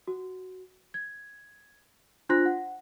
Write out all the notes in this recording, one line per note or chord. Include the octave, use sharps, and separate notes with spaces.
F#4
G#6
D4 F4 C5 C6 F#6 A#6
F#5